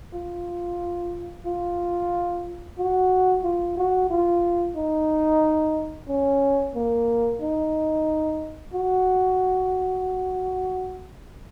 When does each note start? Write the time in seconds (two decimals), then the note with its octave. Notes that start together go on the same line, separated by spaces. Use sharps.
0.13 F4
1.46 F4
2.78 F#4
3.44 F4
3.78 F#4
4.10 F4
4.76 D#4
6.08 C#4
6.75 A#3
7.41 D#4
8.73 F#4